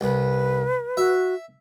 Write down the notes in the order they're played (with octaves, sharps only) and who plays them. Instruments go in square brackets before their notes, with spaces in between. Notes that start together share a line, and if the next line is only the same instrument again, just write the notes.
[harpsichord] C2 [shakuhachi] B4
[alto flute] F#4 [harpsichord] E5